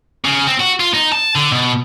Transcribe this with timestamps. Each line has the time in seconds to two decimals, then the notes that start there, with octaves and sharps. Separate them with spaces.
0.25 C#3
0.47 C4
0.60 F#4
0.80 F4
0.94 D#4
1.12 A5
1.35 D3
1.52 B2